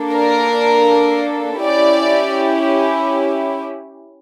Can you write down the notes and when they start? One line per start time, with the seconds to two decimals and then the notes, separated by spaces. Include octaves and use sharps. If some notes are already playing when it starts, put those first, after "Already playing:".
Already playing: A#3 D4 A4
0.13 A#4
1.64 C#4 E4 G4 D5